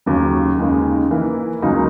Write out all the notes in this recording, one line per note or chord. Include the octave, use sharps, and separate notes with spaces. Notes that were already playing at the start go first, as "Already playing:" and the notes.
D#2 C#3 F#3
D#2 C#3 G#3 D#4
E3 A#3 E4 B4
C#2 C#3 F#3 A#3 D#4